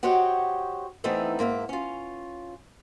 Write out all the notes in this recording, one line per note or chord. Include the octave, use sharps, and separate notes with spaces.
F#4 G4 C5 C#5 D#5 F#5
E3 A3 B3 C4 D#4 E4
G#2 A#3 A#4 E5
C#4 F4